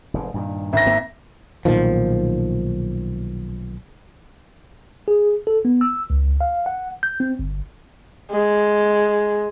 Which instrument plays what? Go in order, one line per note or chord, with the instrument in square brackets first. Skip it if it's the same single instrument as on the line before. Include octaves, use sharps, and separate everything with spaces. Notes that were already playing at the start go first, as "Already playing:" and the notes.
[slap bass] F1 G#2
G2 A#2 D#3
[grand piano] G#1 A#6 [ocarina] E5
[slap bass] A#3 C4
[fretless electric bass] B1 A#2 D#3 F3
[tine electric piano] G#4
A4
B3
E6
C#2
F5
F#5
G6
C4
G1
[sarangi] G#3